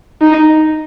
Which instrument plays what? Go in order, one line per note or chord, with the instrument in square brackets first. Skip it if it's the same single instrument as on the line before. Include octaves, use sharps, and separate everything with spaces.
[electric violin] D#4